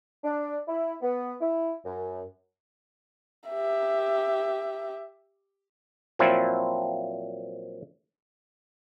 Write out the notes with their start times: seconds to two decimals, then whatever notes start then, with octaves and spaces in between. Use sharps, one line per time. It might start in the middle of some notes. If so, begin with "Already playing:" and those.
0.24 D4
0.68 E4
1.02 B3
1.41 E4
1.85 F#2
3.50 G4 E5
6.19 A#2 F3 F#3 C4 E4